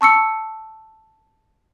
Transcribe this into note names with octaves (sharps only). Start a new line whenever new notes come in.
A5 C#6 E6 C#7